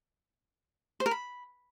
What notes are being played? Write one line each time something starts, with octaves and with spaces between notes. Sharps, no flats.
C5
A#4
B5